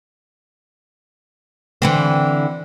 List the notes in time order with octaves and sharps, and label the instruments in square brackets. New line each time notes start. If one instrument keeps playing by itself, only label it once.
[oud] D3 E3 C4